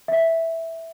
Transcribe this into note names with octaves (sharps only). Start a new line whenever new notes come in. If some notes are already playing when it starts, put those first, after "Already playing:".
E5